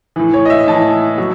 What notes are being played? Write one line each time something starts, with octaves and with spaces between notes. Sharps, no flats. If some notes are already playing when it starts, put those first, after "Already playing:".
A2 E3
C#5
D#5
E5
A2 E3 A5
F#3